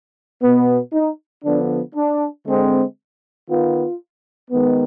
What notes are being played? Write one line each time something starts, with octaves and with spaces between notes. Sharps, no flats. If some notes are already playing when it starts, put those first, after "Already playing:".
B2 B3
D#4
D3 F3 B3 D4
D4
D3 G#3 C4
D#3 B3 F4
D#3 G#3 B3